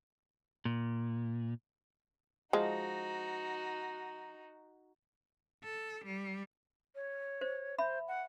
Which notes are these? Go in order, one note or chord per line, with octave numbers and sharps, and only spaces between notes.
A#2
F3 G#3 D#4 F#4
A4
G3
C#5
C5
C5 E5 B5
F#5